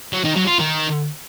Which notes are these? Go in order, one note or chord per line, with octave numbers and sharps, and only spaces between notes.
F#3
D#3
F#3
F4
D#3